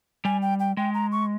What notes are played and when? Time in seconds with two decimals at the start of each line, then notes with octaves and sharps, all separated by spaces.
0.25 G3 G#5
0.42 G5
0.60 G5
0.77 G#3 G5
0.94 A#5
1.12 C#6